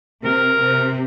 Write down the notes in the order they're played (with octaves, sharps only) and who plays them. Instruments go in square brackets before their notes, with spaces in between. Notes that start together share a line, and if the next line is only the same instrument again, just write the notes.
[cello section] C3 [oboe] A#4
[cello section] C3